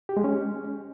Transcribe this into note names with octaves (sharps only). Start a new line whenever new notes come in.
G4
G#3
C#4